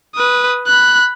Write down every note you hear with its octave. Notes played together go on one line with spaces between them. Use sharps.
B4 D#6
B5 F#6